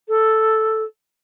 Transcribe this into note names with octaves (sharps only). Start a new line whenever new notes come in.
A4